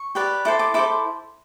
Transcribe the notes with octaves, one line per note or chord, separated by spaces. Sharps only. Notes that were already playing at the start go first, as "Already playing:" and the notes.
Already playing: C#6
G4 B4 D5
E4 A4 C5 D6
D6
E4 A4 C5 D6